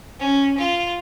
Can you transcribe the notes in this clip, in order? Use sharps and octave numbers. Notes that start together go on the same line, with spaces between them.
C#4
F4